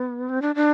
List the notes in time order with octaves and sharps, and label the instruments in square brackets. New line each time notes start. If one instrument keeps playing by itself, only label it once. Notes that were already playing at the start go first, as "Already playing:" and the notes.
Already playing: [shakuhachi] B3
C4
D4
D4